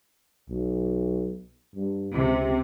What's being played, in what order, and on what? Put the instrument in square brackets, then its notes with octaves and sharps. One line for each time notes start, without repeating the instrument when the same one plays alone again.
[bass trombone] B1
G2
[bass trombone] C#2 [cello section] C3